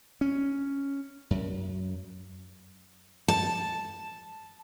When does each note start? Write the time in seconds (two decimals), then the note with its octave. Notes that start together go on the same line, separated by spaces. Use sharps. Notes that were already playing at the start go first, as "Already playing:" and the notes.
0.21 C#4
1.31 F#2
3.28 A5